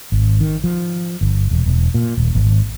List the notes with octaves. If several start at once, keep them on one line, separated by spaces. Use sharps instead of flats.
G#1
D#3
F3
G1
E1
E1
A#2
D#1
G#1